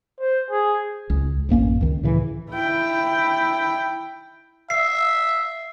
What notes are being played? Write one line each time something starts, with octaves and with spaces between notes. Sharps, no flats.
C5
G#4
C#2
A1 F#2 A#3 C#4
C#2 D#3
A2 C#3 E3
E4 G5
E5 C7